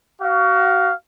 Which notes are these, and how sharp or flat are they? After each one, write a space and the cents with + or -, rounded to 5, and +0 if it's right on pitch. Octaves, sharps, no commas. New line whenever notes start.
F#4 +30 F5 +0